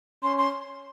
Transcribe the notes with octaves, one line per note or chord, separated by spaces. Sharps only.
C#4 C6
C6